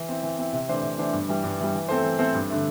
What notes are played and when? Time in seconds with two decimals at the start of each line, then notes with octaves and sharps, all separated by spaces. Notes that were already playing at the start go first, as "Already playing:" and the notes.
Already playing: E3
0.09 C4 E4
0.23 E3
0.38 C4 E4
0.53 C3
0.68 E3 A3 D4 C5
0.83 C3
0.98 E3 A3 D4 C5
1.13 G2
1.28 E3 G3
1.44 G2
1.59 E3 G3
1.74 E3
1.89 A3 C4 A4 C5
2.03 E3
2.19 A3 C4 A4 C5
2.34 G2
2.50 D3 A3